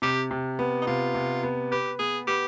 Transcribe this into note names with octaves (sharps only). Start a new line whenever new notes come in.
C3 G4
C3
B3
D#4
C3 F4
C3
B3
G4 B4
B3 G#4
B3 G4